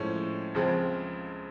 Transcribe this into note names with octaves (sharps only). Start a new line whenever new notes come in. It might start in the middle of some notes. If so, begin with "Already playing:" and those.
Already playing: A2 F3 G#3 C#4
C#2 C#3 F3 G#3 C4